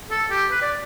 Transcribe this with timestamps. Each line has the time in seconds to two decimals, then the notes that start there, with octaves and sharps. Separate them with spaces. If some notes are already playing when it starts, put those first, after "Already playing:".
0.10 A4
0.31 G4
0.51 B4
0.62 D5